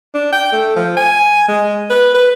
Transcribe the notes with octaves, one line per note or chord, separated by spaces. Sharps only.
D4
G5
A3
F3
G#5
G#3
B4
B4